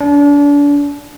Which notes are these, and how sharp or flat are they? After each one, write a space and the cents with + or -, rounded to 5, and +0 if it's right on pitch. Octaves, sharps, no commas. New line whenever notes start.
D4 -35